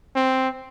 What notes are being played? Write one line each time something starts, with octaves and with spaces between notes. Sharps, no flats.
C4